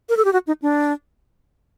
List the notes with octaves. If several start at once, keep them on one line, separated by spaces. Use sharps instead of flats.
A#4
A4
G4
F#4
D#4
D4